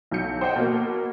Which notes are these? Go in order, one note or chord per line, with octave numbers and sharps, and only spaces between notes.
B1 F#3 G6 C#7
C5 D#5 F#5 G5
B2 A#3